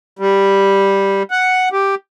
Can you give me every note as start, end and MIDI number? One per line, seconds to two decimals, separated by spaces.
0.19 1.23 55
1.31 1.69 78
1.73 1.95 67